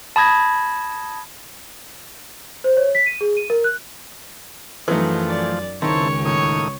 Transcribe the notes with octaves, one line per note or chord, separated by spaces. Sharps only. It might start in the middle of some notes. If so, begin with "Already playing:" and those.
A5 B5 D#6 G#6 A#6
C5
C#5
B6
D#7
G#4
D#7
A#4
F#6
F#2 E3 F3 A3 D#4
D5
C#2 D#3 C4 E4 C#5 A5
D#2 A2 C#5 D#6